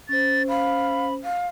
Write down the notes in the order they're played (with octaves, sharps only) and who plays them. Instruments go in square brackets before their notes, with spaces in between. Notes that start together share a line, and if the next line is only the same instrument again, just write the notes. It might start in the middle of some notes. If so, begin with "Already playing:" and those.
[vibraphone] C#4 C5 [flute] A6
[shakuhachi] F5 [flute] B5
[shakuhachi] F5